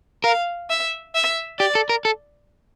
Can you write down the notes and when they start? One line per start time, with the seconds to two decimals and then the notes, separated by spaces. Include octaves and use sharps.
0.24 A#4 F5
0.70 E5
1.15 E5
1.59 G4 D5
1.75 A4
1.89 A#4
2.05 A4